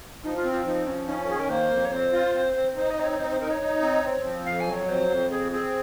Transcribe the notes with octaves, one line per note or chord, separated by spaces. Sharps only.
F3 D#4
F4
C4
F4
F3 D#4
F3 C#4
C#4 D#4
A#4
D#3 G#4
A#4
A#3 C5
F2
C#5
C4 C5
F4
C4
C4
D#4 C5
D#5
C4 C5
C#5
D#4 C5
C5
D#4 A#4
C#5
D#4
C4
C4
F3
F2 F5
G#5
F#3
C#5
F2 C5
F2
C4 G#4
C4 G#4